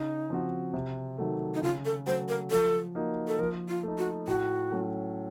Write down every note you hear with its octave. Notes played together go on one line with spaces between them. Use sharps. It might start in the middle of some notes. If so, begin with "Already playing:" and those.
Already playing: C#3 D#4
F3 C4 F#4
C3
D#3 F#3 A3
D#4
C#3 F4
A4
F#3 A3 C5
A#4
F3 A4
A#3 D#4 F#4
A4
F3 A#4
F4
A3 D#4
F#4
A2 F#4
F#3 A3 C#4